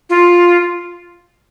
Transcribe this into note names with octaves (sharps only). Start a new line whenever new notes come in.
F4